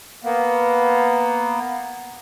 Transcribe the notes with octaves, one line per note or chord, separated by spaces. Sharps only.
A#3 B3